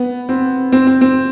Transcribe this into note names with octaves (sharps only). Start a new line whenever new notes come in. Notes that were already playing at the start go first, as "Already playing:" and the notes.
Already playing: B3
C4
C4
C4
C4